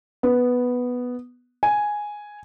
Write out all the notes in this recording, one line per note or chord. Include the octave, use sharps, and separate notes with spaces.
B3
G#5